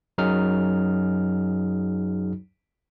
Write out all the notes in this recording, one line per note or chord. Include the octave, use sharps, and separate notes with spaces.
F#2 F#3 D#4 F#4 G#4 F6